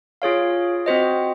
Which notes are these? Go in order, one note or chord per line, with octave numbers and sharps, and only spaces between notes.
F4 G#4 C#5 F5
C4 F#4 C5 D#5